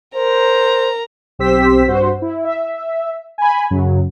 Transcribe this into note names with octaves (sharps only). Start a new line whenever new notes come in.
A#4 C5 A#5
B1 C4 G4 C5 E6 B6
G2 F#4 C5
E4
E5
G#5 B5
F#2 C#3 F#3